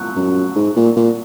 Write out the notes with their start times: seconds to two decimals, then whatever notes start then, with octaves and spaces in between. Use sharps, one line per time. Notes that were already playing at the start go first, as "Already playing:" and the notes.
Already playing: C#6 F#6
0.16 F#2
0.56 G#2
0.76 A#2
0.96 A#2